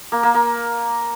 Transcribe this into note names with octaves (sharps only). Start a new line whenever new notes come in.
A#3
A#3
A#3